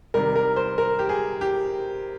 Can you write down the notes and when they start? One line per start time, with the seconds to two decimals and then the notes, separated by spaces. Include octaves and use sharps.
0.14 C3 D#3 G3 A#4
0.36 A#4
0.56 C5
0.78 A#4
0.99 G4
1.09 G#4
1.41 G4